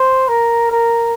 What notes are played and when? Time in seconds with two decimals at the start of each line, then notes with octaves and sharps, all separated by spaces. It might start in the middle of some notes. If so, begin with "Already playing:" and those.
Already playing: C5
0.28 A#4
0.71 A#4